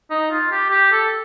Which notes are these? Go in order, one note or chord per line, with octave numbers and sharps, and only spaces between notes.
D#4
F4
G4
G4
A4